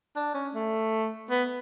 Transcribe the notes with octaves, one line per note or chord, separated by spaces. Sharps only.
D4
C#4
A3
B3